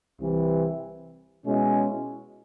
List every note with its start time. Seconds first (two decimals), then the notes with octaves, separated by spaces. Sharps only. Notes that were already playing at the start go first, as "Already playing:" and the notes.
0.20 C2 C3 E3
1.44 B2 G#3 C#4 E4